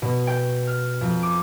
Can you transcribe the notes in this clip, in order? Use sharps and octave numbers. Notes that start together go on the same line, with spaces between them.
B2
G5
F6
F2
D6